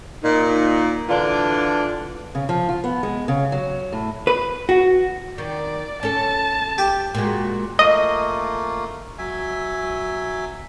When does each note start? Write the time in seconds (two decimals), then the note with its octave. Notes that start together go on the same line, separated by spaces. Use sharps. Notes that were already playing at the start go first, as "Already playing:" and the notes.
0.23 A#2 D#4
1.09 D3 E3 D4 F4
2.35 C#3
2.49 F3
2.69 F4
2.84 B3
3.03 G#3
3.28 C#3
3.52 F#3
3.92 A2
4.27 B4
4.69 F#4
5.38 D#3 D5
6.03 C#4 A4 A5
6.78 G4
7.15 A#2 G#3 F#4
7.79 A3 A#3 F4 D#5
9.18 F#3 E5 G#5